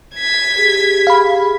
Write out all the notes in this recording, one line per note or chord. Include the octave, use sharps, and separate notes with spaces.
G#6 B6
G4 G#4
F5 B5